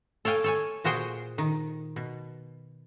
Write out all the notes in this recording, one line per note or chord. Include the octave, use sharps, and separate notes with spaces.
A4 C#5 F5 G5 G#5
A4 C#5 G#5
A#2 F#4 G#4 C5 G5
D#3
B2